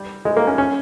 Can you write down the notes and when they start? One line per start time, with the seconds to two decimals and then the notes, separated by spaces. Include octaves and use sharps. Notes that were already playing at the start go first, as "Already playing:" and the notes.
Already playing: G3
0.25 G#3
0.37 A#3
0.47 C#4
0.58 C#4